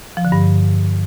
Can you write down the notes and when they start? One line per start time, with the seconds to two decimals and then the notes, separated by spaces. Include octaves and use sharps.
0.17 F3
0.25 D3
0.32 G2